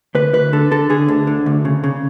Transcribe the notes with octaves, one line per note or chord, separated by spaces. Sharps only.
D2 B4
D2 B4
D3 A4
D3 A4
D3 G#4
D2
D3
D2
C#3
C#3